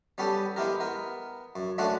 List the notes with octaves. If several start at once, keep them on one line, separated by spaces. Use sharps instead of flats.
G3 B3 C#4 G4 A4
G#3 B3 E4 G4 A#4
B3 A#4
F#2
G#3 A3 C#4 D4 F#4